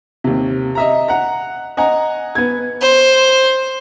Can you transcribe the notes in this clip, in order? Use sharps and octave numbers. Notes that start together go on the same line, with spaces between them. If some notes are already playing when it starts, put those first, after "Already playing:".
D#2 C3
D#5 E5 A#5
F#5 A#5
D#5 F#5 G#5 A#5
B3 G#6
C5